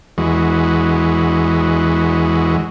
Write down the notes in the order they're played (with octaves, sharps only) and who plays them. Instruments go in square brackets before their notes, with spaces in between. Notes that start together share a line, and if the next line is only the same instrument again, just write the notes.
[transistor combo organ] E2 E3 G#3 F#4